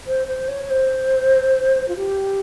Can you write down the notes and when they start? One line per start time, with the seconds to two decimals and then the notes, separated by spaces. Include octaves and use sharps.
0.06 C5
0.27 C5
0.47 C#5
0.69 C5
1.88 F4
1.96 G4